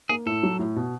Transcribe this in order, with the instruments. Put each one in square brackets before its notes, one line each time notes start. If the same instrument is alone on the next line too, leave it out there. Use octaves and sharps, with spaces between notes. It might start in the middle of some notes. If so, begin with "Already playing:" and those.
[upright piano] A#3 [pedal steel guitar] G#4
[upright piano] A2 [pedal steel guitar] A4
[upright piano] F#3
A2
B2